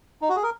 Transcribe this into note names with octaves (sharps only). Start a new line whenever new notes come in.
D#4
F#4
G#4
A#4